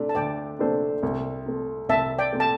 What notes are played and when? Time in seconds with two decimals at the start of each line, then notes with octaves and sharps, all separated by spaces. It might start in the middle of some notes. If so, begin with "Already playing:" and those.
Already playing: C3 A3 D4
0.09 A5
0.15 D2 D5 G5
0.59 C3 A3 D4 C5
1.03 C2
1.46 C3 A3
1.89 C2 E5 A5
2.19 D5 G5
2.33 C3 A3
2.40 A5